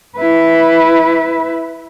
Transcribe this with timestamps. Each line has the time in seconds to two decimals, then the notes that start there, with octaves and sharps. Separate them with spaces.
0.18 E4 B4